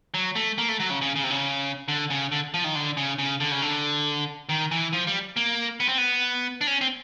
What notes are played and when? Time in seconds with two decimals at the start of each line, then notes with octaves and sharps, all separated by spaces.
0.14 F#3
0.36 A3
0.58 A#3
0.69 A3
0.80 F#3
0.90 C#3
1.01 C#3
1.16 C#3
1.23 C3
1.30 C#3
1.88 D3
2.10 C#3
2.32 D3
2.54 F3
2.64 D#3
2.75 D3
2.97 C#3
3.18 C#3
3.40 D3
3.51 C#3
3.62 D3
4.49 D#3
4.71 E3
4.93 F3
5.07 G3
5.37 A#3
5.80 B3
5.88 C4
5.98 B3
6.61 D4
6.67 C#4
6.81 C4